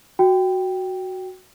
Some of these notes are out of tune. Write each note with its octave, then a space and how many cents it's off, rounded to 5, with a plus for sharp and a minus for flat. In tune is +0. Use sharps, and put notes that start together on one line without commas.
F#4 +0 G5 +0